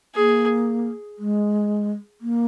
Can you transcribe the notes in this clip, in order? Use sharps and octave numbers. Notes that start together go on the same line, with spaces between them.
A#3 G#4
G#3
A#3